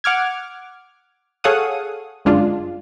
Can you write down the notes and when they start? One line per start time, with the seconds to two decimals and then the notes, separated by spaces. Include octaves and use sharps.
0.04 F#5 D6 F6 G#6
1.44 G#4 A4 C#5 F5 F#5 D#6
2.25 G1 F#2 G#3 D4 F4